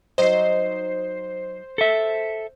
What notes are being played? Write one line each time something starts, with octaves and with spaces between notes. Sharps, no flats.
F#3 D#4 C5 D#5 C7
A4 E5